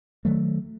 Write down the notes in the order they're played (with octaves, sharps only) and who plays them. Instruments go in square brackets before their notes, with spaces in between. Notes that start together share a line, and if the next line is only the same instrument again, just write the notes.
[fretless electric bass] D#3 F#3 A3